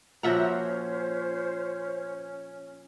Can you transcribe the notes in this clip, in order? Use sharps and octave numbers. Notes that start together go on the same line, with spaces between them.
A#2 F3 C#4 F#4 C5 E5 F#5 A#5